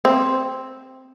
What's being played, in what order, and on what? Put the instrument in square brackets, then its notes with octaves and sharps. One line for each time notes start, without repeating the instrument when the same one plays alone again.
[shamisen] C4